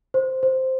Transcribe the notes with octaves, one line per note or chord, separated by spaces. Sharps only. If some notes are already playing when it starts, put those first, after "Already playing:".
C5
C5